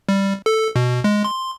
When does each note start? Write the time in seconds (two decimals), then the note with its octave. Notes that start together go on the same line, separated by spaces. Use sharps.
0.09 G3
0.46 A4
0.76 B2
1.04 G#3
1.25 C6